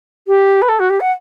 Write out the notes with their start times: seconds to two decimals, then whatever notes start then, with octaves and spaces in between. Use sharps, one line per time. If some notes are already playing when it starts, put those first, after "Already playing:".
0.27 G4
0.62 B4
0.68 A4
0.79 F#4
0.89 G4
1.00 F#5